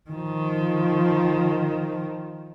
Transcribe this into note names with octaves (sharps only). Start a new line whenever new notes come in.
D#3 F3